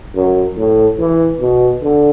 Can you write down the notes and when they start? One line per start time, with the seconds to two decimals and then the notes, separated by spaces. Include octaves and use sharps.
0.15 F#2
0.57 A2
0.99 E3
1.41 B2
1.82 D3